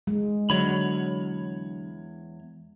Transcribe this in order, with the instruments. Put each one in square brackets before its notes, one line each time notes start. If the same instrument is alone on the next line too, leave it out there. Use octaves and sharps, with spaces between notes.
[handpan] G#3
[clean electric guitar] E2 C#5 B5 [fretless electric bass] D3 F#3